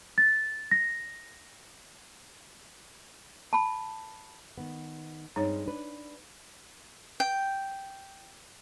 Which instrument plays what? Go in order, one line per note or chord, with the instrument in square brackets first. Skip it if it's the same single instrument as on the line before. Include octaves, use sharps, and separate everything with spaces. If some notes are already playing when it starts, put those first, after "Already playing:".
[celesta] A6
A#6
[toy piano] A5 B5
[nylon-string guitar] D#3 B3
[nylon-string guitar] G2 G#3 C4 [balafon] D#4 C#5
[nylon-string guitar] D4 B4
[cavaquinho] G5